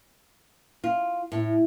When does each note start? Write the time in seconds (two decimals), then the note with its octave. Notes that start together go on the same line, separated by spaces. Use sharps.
0.84 F4
1.32 A2